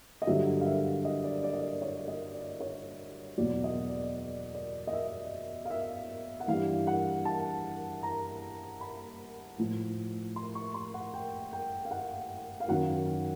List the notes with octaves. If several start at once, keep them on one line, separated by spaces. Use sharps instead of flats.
D#5
G2 D3 F#3 E5
F5
E5
D#5
D5
D5
D#5
D5
C#5
D#5
D5
C#5
E2 B2 F#3 D5
D#5
D5
D5
D5
D#5
E5
F5
E5
F#5
G2 E3 F5
F#5
A5
A#5
B5
A2 F3
C6
C#6
C6
F#5
G5
G5
F5
F#5
F5
F#2 D#3 F#3 F#5